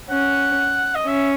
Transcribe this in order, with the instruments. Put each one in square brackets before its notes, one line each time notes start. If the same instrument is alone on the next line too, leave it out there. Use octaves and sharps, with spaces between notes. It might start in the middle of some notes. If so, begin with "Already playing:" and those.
[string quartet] C#4 [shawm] F#5
[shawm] D#5
[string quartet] C#4 [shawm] E5